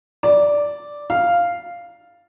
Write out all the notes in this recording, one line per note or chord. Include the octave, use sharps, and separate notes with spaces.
D5
F5